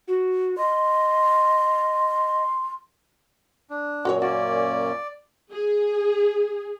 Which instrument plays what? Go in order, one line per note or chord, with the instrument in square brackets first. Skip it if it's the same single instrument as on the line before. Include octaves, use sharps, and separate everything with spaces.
[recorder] F#4
[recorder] D#5 [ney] C6
[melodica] D4
[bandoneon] F#2 A#2 [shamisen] F#4 A#4 C#5
[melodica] A#3 C#4 [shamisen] F#4 [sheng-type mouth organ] D5
[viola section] G#4